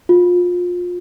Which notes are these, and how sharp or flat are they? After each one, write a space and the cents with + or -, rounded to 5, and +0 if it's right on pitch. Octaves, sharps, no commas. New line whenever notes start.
F4 +25